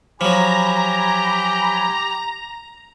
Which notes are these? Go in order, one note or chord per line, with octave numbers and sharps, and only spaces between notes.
F3 F#3 G4 G#5 A#5 B5